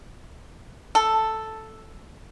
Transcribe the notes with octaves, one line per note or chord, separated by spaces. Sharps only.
A4